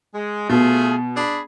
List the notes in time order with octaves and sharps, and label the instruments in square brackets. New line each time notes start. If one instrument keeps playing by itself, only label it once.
[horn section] G#3
[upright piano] B2 [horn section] A3 F4 G#4
[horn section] D4 G#4 B5